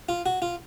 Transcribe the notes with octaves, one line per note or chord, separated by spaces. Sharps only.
F4
F#4
F4